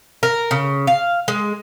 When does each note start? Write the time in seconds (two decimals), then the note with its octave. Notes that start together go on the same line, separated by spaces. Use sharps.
0.23 A#4
0.51 C#3
0.87 F5
1.28 G#3